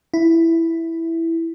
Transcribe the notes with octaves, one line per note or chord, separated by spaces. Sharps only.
E4